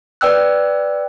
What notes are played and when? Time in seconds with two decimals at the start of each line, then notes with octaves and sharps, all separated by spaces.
0.21 B4 D5 G5 E6 F#6